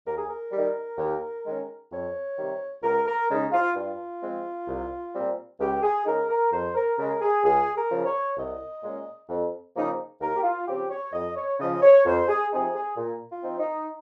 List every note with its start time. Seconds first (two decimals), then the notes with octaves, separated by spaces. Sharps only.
0.06 D#2 A#4
0.16 G#4
0.26 A#4
0.52 D#3 G3
0.98 D#2
1.44 D#3 G#3 C#4
1.91 F2 C#5
2.37 C3 D#3 G3
2.83 C#2 A#4
3.06 A#4
3.29 C#3 G#3 D#4
3.52 F4
3.75 G2 F4
4.22 F3 G#3 C4
4.68 C2
5.13 A#2 G3 C4
5.59 C#2 G4
5.82 G#4
6.05 C#3 G#3 D#4 A#4
6.29 A#4
6.51 F2 C5
6.75 A#4
6.97 C#3 G#3 A#4
7.21 G#4
7.44 C#2 G#4
7.75 A#4
7.90 C#3 F3
8.05 C#5
8.36 C2 D#5
8.82 A#2 G#3 C#4
9.28 F2
9.74 C#3 F3 A#3 D#4
10.20 D#2 A#4
10.35 G4
10.43 F4
10.66 C#3 F3 C4 G4
10.90 C#5
11.12 F2 D#5
11.35 C#5
11.59 C#3 F3 D#5
11.81 C#5
12.05 F2 C5
12.28 G#4
12.51 C3 F3 C4 D#4 G#4
12.75 G#4
12.97 A#2
13.28 F4
13.43 F3 C4 D#4
13.59 D#4